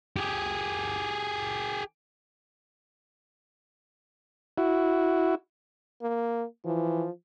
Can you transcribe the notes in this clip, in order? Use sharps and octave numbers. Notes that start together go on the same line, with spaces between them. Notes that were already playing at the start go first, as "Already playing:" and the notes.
G4 G#4
E4 F#4
A#3
E3 F3